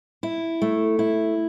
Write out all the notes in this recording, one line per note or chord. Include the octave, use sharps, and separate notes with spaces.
E4
A3
E4